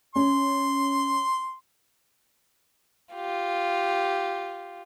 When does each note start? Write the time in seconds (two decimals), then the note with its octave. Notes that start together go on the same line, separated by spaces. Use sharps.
0.16 C#4 C6
3.14 F4 G4